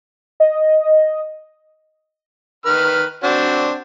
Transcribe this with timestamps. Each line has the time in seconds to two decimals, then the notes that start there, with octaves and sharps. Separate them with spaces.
0.40 D#5
2.66 D#3 B4 F6
3.23 C4 D4 F#4